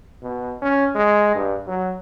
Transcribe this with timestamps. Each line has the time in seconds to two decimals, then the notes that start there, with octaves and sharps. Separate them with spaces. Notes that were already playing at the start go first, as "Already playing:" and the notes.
0.22 B2
0.62 C#4
0.96 G#3
1.35 G2
1.67 F#3